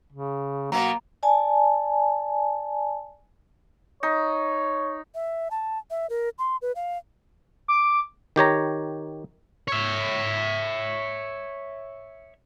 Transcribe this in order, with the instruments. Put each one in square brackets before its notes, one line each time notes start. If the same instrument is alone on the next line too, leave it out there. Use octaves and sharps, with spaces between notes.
[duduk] C#3
[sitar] B2 F#3 [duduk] A#3 [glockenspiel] A#5
[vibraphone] D5 G#5 A5
[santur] D#4 [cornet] C#5
[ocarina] E5
A5
E5
A#4
C6
B4
F5
[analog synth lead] D6
[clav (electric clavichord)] D#3 G4 C#5 A#5
[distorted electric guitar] C#5 E5